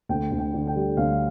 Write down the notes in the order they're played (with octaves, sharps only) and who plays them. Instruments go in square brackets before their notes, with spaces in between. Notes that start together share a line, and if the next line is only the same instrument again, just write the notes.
[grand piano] D2 G5
D2
G5
D3
G5
G3
D2 F5